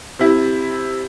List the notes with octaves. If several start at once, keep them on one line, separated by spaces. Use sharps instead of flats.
C3 E4